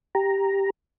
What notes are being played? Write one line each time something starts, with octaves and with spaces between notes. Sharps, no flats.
G4 A#5